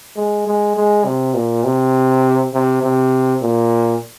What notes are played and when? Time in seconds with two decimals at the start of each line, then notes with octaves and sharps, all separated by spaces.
0.16 G#3
0.47 G#3
0.77 G#3
1.05 C3
1.35 A#2
1.64 C3
2.54 C3
2.83 C3
3.42 A#2